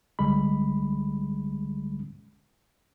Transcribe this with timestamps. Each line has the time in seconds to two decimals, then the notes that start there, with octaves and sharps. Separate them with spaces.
0.19 C2 D3 G3 G#3 B5